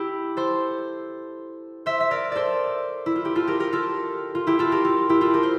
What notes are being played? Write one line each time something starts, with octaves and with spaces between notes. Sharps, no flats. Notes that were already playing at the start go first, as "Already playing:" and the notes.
Already playing: E4 G4
A4 C5
C5 E5
E5
A#4 D5
A4 C5 D5
E4
F4
G4
F4 A4
G4 A#4
G4 A#4
F4 A4
F4
E4 G4
F4 A4
G4 A#4
F4
E4 G4
F4 A4
G4 A#4
C5